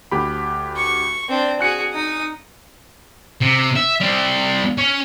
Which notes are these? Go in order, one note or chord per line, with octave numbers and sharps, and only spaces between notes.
D2 G4 B5
C#6
C4 D4
F#4 G#4 G#5 F#6 C#7
D#4 D#6
C3
E5
G3 C4
C#4